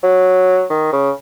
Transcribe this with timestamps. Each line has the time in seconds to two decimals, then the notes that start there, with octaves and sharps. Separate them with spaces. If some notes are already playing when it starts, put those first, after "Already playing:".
0.03 F#3
0.69 D#3
0.93 C#3